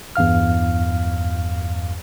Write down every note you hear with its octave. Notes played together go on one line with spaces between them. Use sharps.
E2 G2 F5 F6